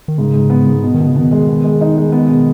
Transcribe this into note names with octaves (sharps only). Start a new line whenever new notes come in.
D#3
G#2 C#3
G#2
B3
G#2
B2
D#3
B2
C#3
B2 D#3
G#3
B3
G#3
D#4
G#3
B3
B2